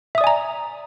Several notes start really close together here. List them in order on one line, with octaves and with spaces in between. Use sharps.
E5 D#6 D5 G#5 A#5